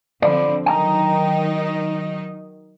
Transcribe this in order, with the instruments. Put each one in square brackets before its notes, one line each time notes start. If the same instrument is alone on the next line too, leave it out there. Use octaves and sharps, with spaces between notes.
[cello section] D3 F3 C4 [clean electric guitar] D5 B5
[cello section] D#3 F#3 D#4 [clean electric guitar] G5 A5 A#5